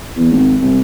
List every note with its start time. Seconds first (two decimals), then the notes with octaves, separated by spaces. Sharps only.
0.16 E2
0.31 G#1
0.61 C2